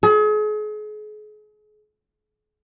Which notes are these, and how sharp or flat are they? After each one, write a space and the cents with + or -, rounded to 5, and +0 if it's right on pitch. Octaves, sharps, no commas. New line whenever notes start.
G#4 +40